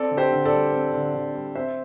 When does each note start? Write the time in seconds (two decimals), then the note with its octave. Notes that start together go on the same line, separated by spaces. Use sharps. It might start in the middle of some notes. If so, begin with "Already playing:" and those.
Already playing: C4 A4 D5
0.11 D3
0.17 G4 C5
0.32 D3
0.45 A4 D5
0.52 G3
0.72 C4
0.94 D3
1.14 D3
1.35 G3
1.55 C4 C5 E5